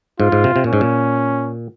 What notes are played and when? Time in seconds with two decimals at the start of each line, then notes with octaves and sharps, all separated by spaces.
0.20 G#2 F4
0.32 G#2
0.44 C3
0.56 C3
0.64 A#2
0.68 G#2 C#4
0.81 A#2